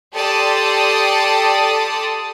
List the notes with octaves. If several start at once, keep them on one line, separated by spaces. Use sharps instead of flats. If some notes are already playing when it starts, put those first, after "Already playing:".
G4 A4 D5 A5 C6 D#6